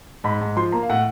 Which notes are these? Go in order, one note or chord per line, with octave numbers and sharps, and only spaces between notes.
G#2 B5
G#2
F3 C6
A#3 A#5
F5
A2 F#5